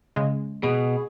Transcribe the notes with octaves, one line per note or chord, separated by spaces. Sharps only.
C#3 G#3
B2 G#4